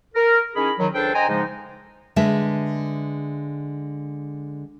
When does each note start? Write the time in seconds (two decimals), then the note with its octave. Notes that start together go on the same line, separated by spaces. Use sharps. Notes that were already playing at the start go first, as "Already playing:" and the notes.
0.15 A#4
0.55 D#3 C#4 E4 G#4 B5
0.79 D#3 F#3
0.94 C#2 D4 A4 C5 G5
1.14 C5 D#5 G5 G#5 A#5
1.28 G#2 C#3 F3 G#3 D#4
2.16 D3 G#3 B4 E5